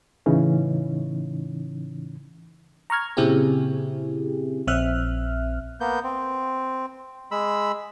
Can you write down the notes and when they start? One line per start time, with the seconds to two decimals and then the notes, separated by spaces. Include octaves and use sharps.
0.26 A2 C#3 E3 C#4 D#4
2.90 A#5 C#6 F6 G#6
3.17 A#2 C#3 C4 E4 G4 G#4
4.67 A#1 C4 E5 F6 F#6
5.81 A#3 B3 G6
6.03 C4
7.31 G#3 B5 E6